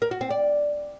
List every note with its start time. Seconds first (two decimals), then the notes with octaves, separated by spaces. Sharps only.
0.02 A#4
0.11 F#4
0.21 C4
0.30 D5